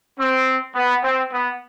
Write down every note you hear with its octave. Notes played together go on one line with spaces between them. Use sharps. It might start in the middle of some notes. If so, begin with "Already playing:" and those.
C4
B3
C4
B3